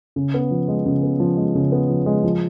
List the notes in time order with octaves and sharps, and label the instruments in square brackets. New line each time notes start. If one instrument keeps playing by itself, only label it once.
[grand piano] C#3
B3
F3
G#3
C#3
B3
F3
G#3
C#3
B3
F3
G#3
F3